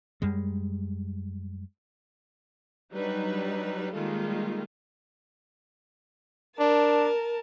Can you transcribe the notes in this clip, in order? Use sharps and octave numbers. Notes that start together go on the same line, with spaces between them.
F#2 G3 G#3
F#3 G3 D4 D#4 B4
D#3 G3 G#3 A#3 F4 A4
D4 A#4 A5